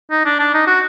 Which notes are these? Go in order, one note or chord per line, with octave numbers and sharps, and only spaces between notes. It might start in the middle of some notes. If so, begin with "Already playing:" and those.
D#4
D4
D4
D#4
F#4